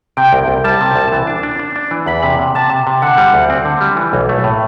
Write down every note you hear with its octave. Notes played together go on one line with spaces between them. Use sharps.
C3 G5
C2
C2
G3 A5
C3
C2
E3
D4
D4
D4
D4
E3
E2 B5
C3
C3
C3 A5
C3
C3
D3 F#5
G3
D2
C4
D3
G3
E3
B1
A3
A2